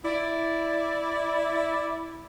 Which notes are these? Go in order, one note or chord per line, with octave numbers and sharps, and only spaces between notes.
E4 D5